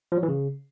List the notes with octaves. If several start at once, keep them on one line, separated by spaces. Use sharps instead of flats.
F3
F#3
E3
C#3